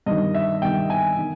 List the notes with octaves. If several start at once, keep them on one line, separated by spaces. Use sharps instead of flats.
G2 D#3 D#5
E5
G2 D#3 G5
G#5
D#3